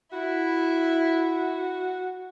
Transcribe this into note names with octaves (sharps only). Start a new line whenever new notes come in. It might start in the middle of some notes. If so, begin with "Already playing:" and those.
E4 F#4 E5